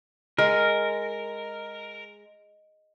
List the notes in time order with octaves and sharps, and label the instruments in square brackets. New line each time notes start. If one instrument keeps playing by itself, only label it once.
[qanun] G#3 [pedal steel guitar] A#4